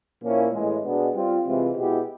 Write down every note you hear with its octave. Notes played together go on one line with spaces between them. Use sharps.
A#2 F3 A#3 C#4 E4
A2 E3 G#3
B2 G#3 B3 D4
G3 C4 F4
C3 E3 G#3 C4 F4
B2 G#3 B3 E4 G4